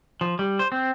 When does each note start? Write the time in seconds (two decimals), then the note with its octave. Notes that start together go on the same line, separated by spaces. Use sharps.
0.21 F3
0.39 G3
0.59 C5
0.72 C4